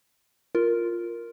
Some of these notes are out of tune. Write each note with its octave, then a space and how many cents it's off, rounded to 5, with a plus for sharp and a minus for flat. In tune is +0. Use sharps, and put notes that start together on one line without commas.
F4 +0 A#4 +0